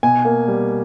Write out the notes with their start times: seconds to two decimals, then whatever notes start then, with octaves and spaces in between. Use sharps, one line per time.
0.03 B2 G#5
0.25 A#3
0.48 G3